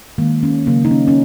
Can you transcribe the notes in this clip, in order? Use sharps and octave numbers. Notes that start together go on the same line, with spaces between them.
D#3 G#3 A#3
C#4
C#3 F#3 A#3
D#4
C#4
C#4